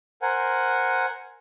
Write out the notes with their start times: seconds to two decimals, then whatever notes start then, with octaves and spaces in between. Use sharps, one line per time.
0.22 A#4 C5 F#5 G#5